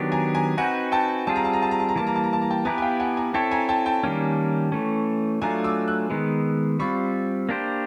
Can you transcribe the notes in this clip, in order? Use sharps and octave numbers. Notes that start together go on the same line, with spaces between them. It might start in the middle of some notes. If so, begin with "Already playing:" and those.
Already playing: D#3 F#3 B3 D4 G4
G#5 A#5
G#5 A#5
C4 D#4 F#4 B4 F#5 G#5
G5 A5
G3 C4 F4 G#4 A5
A#5
A5
A#5
A5
A#5
A5
A#5
E3 G3 A#3 A5
A#5
A5
A#5
A5
A#5
G5 A5
B3 E4 G4 B4 G#5 A#5
G#5
F5 G5
F#5 G#5
G#5 A#5
C4 E4 A4 C#5 G5 A5
G#5 A#5
G5 A5
G5 A5
D#3 G3 A#3 C#4
E3 A3 C#4
F#3 A3 D4 F4 G#5 A#5
D6 E6
E6 F#6
D#3 G#3 B3
G3 C4 F4 B5 C#6
A#3 D4 G4 C5